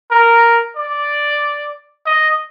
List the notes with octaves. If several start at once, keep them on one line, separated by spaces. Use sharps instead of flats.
A#4
D5
D#5